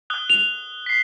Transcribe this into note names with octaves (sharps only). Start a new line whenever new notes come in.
D#6 F#6 G7
F7
B6 C7